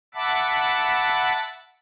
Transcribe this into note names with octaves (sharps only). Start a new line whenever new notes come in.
E5 F#5 A5 B5 D6